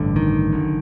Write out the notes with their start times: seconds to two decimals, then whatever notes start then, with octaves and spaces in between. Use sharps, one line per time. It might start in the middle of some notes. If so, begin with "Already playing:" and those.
Already playing: A1 G2 D3
0.16 D#3
0.52 F#1 F#2 D3